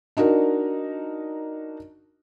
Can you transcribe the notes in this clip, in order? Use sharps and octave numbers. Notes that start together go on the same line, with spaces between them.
D4 D#4 F#4 A#4